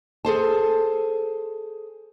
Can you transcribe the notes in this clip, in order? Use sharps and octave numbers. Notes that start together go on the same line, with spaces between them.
G#4 A4 C5 A5